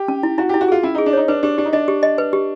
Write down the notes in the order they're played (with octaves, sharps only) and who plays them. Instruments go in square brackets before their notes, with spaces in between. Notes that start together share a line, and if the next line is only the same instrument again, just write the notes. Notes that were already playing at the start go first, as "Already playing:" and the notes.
Already playing: [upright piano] G4
[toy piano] C#4
E4
[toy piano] E4 [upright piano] F#4
[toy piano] E4 [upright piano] G4
[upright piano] F#4
[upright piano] F4 [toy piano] G#4
[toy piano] C#4 [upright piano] E4
[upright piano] D#4 [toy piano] G#4
[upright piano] D4
[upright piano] D#4 [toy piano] C#5
[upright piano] D4 [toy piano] B4
[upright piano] D4 [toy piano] G4
[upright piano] D4 [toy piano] G4
[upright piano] D#4
[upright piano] D4 [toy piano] D#5
[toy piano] G4
D#5
B4
G4